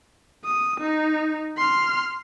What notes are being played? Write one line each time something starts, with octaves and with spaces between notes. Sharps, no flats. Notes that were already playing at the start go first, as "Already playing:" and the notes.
D#6
D#4
C6 F6